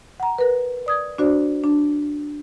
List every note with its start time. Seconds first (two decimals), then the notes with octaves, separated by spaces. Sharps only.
0.20 F#5 A#5
0.38 A#4 B4
0.86 D5 D#6 G#6
1.18 D4 F#4 C5 D5
1.64 D4